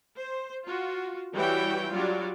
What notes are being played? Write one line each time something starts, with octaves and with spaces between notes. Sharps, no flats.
C5
F4 F#4
E3 G3 E4 F#4 C#5 G5
F#3 G3 D4 F4 F#4 D5